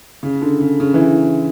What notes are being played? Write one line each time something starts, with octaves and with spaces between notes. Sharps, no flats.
C#3
D3
C#3
C#3
E3